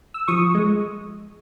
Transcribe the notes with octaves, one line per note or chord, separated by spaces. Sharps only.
E6
F3 C#6 D#6
G#3